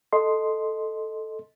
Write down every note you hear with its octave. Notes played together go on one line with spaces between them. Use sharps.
A4 D#5 C6